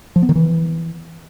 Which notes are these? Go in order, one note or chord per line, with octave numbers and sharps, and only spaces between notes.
F3
B3
D#3
E3